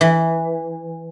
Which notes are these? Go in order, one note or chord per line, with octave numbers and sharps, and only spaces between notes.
E3